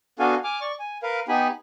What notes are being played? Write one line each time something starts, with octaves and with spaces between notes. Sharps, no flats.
B3 D4 F#4 A4 F5 G#5
G#5 D6 F6
D5 C#6
G#5
A#4 B4 F5
B3 D#4 G4 G#5 B5